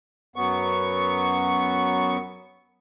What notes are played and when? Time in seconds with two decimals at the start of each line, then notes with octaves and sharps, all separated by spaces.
0.36 F#2 F#3 B3 C#6